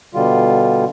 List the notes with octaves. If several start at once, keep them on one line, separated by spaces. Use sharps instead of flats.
B2 D3 G3 F4